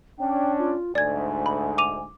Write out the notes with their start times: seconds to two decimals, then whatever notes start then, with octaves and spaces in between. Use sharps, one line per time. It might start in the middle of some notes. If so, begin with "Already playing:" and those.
0.19 C#4 D4 G5
0.58 F4
0.95 D2 G#2 D5 G#5 G#6
1.46 B5
1.78 D6 D#7 F7